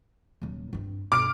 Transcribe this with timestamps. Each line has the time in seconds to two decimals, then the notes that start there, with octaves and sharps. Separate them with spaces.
0.42 D#1 F#3
0.73 G2 C4
1.12 G2 B2 D6 F6 D7